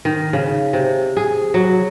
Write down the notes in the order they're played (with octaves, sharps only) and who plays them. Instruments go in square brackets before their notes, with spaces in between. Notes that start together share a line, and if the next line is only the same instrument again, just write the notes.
[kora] D#3
C#3
C3
G#4
F#3